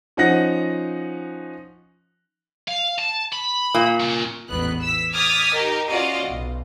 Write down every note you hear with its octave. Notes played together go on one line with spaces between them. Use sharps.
F3 C#4 D#4 F#5 A#6
F5
A5
B5
A#2
C#4 F4
A1 E2 G#2 B3 F#6
E6 B6
D6 D#6 F6 G#6 A6 B6
D#4 G4 A#4
C#4 F4 F#4 D5 D#5 F5
B1